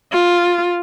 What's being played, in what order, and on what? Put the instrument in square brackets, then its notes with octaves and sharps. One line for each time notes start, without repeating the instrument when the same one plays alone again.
[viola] F4